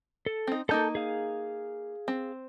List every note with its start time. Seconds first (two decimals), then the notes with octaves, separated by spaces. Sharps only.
0.26 A4
0.47 C4 D#4
0.69 A#3 D#4 A4 A5 A#5 G6
0.95 G#4 F5
2.08 C4